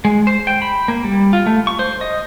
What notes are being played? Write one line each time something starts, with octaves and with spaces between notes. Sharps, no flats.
G#3
C5
G5
B5
A#3
G3
F4
A3
C#6
C5
D#5